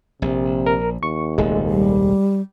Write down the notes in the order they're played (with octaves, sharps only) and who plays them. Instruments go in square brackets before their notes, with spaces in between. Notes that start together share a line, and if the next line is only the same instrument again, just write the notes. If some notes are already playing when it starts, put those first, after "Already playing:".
[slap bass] A#1 [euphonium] C3
[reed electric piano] A#4
[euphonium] D#2 [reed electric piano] C#6
[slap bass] D#1 C2 [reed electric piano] G#3 A3
[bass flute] G3